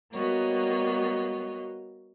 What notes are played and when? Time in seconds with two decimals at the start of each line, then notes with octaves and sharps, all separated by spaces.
0.12 G3 A#3 B3 F#4 C#5 D#5